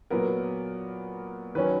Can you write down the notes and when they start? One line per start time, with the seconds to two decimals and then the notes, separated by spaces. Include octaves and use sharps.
0.10 A#2 F#3 B3 A#4
1.55 D#3 F#3 C#4 B4